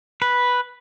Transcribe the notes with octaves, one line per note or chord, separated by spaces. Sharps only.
B4